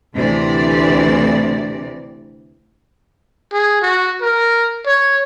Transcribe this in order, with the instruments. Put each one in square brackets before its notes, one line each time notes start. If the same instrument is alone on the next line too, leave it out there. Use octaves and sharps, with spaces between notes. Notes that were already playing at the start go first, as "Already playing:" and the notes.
[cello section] D2 C3 E3 D5
[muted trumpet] G#4
F#4
A#4
C#5